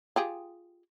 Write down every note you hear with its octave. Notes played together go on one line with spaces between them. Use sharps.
F4 G4 G#4